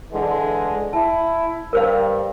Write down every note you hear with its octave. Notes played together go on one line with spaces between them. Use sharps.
D3 E3 G#3
E4 A5
G2 A#4 C5 F5